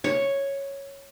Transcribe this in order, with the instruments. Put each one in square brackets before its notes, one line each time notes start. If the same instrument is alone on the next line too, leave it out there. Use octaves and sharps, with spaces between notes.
[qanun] C#5